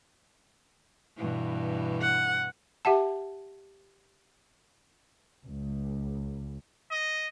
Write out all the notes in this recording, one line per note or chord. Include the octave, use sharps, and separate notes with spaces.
G2 B2 E3
F#5
G4 E5 F#5 A5
C#2
D#5